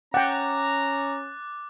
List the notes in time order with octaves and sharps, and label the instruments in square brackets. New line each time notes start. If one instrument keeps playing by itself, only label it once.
[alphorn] C#4 [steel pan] F#5 G5 [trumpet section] A#5 [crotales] D6 F#6 A6